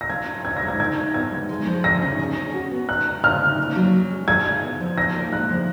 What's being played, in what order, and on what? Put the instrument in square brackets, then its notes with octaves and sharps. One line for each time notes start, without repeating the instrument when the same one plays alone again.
[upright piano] A#6
[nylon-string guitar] F4 [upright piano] G#6
[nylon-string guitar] C#4
[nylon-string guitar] C#4 [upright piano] G#6
[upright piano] A#6
[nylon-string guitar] G#3
[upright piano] G#6
[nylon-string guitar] A#4 [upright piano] G#6
[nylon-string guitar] D#4
[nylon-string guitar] B3 [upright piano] G#6
[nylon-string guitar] G#3
G#3
F3
[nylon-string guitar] G#4 [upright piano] A#6
[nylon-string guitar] C#4
G#4
C#4
F#4
B3
[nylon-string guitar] D#4 [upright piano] F#6
[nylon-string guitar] G#3
[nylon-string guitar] F4 [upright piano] F6
[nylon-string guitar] C#4
A#3
F#3
C#4
G#3
[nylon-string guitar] G#4 [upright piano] G#6
[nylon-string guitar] F4
B3
F3
[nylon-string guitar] D#4 [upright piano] A#6
[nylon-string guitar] A#3
[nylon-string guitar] G#3 [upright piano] F#6
[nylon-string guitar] F3